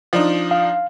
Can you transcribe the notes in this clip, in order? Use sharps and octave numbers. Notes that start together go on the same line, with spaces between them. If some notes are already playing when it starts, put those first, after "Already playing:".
F3 D4 D#4
F5